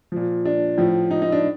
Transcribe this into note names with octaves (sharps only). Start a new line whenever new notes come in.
A#2 F3
D4
A2 F3
D#4
D#4
D4